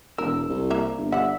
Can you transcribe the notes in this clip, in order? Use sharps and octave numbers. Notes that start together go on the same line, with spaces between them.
E1 A#4 E6
C2
A#3 E5 A#5
G1
G3 E5 F#5